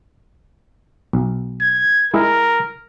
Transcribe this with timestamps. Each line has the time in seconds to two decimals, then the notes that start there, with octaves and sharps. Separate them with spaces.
1.13 B1
1.61 G#6
2.14 G#3 E4 G#4 A#4